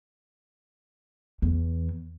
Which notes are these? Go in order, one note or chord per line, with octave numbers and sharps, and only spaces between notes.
E2